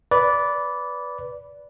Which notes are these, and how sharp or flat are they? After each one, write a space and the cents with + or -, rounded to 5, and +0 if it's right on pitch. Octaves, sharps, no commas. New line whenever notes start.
B4 +0 D5 -20